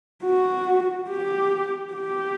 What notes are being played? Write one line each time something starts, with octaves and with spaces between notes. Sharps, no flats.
F#4
G4
G4